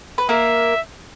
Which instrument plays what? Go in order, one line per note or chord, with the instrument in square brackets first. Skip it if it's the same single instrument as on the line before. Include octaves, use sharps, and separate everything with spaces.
[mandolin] B4
[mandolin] A#3 A#4 [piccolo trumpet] E5